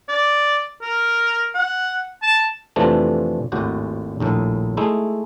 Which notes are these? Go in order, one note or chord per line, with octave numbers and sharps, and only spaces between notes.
D5
A#4
F#5
A5
F2 C3 E3 F3 A3 D4
G#1 D#2 A2 F#4 G4
A#1 D#2 A2
G#3 A3 D#4 E4